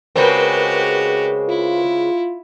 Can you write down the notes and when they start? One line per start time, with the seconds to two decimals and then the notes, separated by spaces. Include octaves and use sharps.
0.16 C#3 G#3 C4 F#4 G4 A#4 B4
1.49 E4 F4